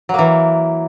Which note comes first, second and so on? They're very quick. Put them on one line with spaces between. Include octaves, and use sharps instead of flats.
F#3 A#3 E3